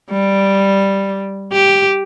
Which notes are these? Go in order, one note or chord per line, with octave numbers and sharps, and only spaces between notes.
G3
G4